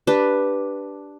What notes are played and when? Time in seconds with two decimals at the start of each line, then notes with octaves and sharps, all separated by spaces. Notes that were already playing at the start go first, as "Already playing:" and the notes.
0.07 D4 G4 B4